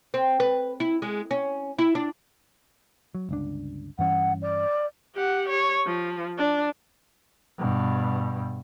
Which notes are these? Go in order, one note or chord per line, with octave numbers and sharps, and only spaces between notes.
C4
B4
E4
G#3
C#4
E4
D4
F#3
G1 C#2 D4
G2 E3 C#4 F#5
D5
G4 F#5
C#5
F3
D4
G2 B2